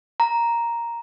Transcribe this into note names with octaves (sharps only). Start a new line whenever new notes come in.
A#5